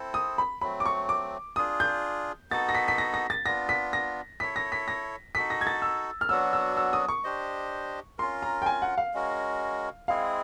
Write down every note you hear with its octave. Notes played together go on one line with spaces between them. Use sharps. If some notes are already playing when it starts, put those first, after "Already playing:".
Already playing: C4 E4 A4 C5
D#6
B5
F#3 A3 C4 B5
D6
C#6
D6
D4 F4 G#4 D#6
G6
B3 D#4 F#4 A4 A6
A#6
B6
B6
A#6
A#6
A6
B3 D4 F4 A#6
B6
A#6
E4 A4 C#5 B6
A#6
B6
A#6
D#4 F#4 A4 B6
A#6
G#6
A6
E6
F6
F#3 B3 D4 F#4 E6
E6
E6
D#6
C#6
D4 G4 C5 D#5
C#4 F4 A#4 C6
A#5
G5
G#5
F#5
F5
G#3 C#4 F#4 A#4
G#3 C4 E4 G#4 F5